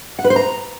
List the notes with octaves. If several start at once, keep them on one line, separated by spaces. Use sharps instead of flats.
F#5
B4
C5
A#5